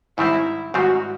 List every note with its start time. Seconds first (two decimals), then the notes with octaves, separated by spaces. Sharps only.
0.18 G#2 D#3 G3 C4 E4
0.74 G#2 D#3 G3 C4 F#4